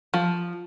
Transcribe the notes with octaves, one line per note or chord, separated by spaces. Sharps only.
F3